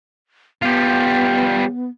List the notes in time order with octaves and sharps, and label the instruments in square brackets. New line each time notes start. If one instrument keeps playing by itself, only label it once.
[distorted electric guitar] G3 F4 [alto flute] B3